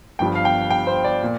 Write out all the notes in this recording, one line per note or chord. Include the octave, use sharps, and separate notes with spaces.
G1 G2 F3 G5
F5
G5
G5
C5
D5
A#2